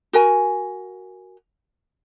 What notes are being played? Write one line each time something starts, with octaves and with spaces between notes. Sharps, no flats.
F#4 A#4 G#5